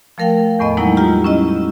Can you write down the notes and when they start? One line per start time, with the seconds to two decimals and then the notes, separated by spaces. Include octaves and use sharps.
0.18 F3 A3 A#4 F5 G5
0.59 E2 A2 B3 D#5
0.77 F#3 G#3 A#3 B3 D#4 E4
0.97 G3 F4 G4 A#5
1.24 C#4 E4 D#5